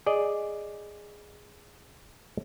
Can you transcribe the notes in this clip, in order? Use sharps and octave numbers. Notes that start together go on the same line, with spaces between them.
G#4 D5 D#5